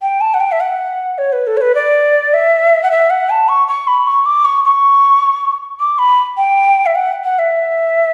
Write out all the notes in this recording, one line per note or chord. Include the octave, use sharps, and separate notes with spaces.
G5
A5
F#5
G5
E5
F#5
C#5
B4
A4
C#5
B4
D5
E5
F#5
E5
F#5
A5
C#6
C#6
B5
C#6
D6
C#6
C#6
D6
B5
G5
E5
F#5
F#5
E5